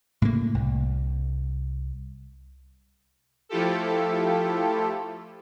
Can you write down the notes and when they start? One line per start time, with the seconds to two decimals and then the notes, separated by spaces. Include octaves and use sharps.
0.22 A2 C#3 A#3
0.54 C2
3.49 F3 A3 E4 F4 G4 A4